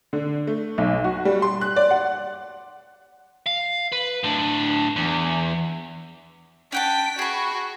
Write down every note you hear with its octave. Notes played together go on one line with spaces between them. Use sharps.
D3
A3
B1
F#4
G3
C6
F#6
D5
F#5
F5
B4
A2 D4
E2
C#4 F#5 G5 A5 B6
F#4 G#4 B5